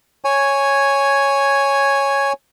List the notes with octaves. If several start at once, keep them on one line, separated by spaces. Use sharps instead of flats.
C#5 G#5